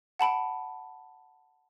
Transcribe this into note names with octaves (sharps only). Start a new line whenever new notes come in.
F#5 A5 B5 D7